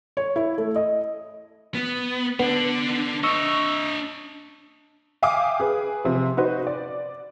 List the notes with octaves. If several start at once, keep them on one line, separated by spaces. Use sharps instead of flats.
C#5
E4
A3
D#5
B3
D3 B3 D4
D4 D#5 C#6 E6
E5 F5 G5 G#5 D6 D#6
G#4 B4
C3 F3
D#4 F#4 B4 C5
D5